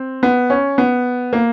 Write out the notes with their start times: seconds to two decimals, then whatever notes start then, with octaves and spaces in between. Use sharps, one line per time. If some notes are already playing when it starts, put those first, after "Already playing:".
Already playing: C4
0.23 B3
0.50 C#4
0.78 B3
1.33 A#3